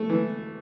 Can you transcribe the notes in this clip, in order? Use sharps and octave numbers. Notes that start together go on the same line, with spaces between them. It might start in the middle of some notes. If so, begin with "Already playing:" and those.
Already playing: A3
E3